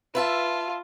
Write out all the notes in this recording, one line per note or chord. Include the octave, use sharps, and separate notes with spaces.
F4 B4 E5 A5